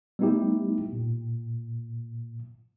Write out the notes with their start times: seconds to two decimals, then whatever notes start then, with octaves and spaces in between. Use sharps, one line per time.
0.19 G3 A3 B3 D#4 E4 G4
0.93 A#2